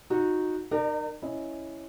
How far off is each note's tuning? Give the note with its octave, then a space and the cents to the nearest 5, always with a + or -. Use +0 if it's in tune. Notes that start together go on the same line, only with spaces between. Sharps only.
D#4 +0 F#4 -20
D#4 -35 A#4 +0 D5 +35
C#4 +0 E4 +0 D#5 +0